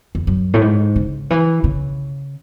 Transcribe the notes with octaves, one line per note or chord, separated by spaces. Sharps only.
E2
F#2
A2
G#2
C#3
E3
C#3